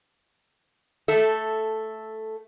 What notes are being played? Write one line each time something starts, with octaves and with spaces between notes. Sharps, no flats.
A3 A4 E5